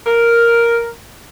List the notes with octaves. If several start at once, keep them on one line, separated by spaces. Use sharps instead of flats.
A#4